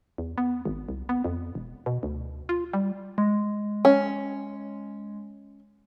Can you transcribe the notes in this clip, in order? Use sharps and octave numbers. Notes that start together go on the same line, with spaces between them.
E2
B3
G#1
C2
B3
F2
E1
B2
D2
F4
G3
G#3
C#4